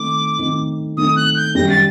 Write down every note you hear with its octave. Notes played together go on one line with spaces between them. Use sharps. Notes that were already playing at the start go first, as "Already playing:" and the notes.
Already playing: D#3 A3 C4 D#4 D6
D#3 A3 C4 D#4
D#3 A3 C4 D#4 D#6
F#6
G6
F#2 D#3 G3 A#6
A6